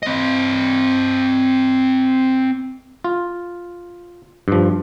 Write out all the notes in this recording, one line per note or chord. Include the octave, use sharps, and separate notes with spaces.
C4 D#5
F4
G2 F3